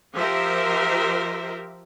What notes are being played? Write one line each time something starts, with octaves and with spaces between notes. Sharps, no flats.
F3 G4 A#4 C5 E5